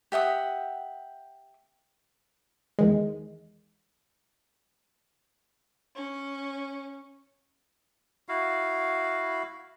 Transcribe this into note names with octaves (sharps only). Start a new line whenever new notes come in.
G4 E5 F#5 D#6
E2 D#3 G#3
C#4
E4 F#4 F5